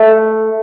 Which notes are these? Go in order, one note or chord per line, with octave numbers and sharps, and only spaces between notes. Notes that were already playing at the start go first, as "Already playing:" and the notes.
Already playing: A3